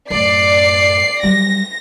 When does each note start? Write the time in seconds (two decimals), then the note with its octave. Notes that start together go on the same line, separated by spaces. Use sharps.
0.10 F#2 A2 D5 C7
1.23 F#3 G3 A#6